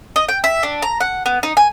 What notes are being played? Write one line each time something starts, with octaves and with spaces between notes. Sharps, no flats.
D#5
G5
E5
D4
A#5
F#5
B3
D#4
G#5